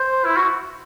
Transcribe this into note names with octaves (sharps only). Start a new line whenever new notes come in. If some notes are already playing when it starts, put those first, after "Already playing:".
Already playing: C5
E4
F#4